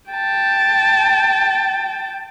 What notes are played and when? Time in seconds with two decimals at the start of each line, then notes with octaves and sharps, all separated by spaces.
0.10 G5 A5